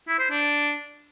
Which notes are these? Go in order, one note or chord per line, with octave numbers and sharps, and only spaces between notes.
E4
C5
D4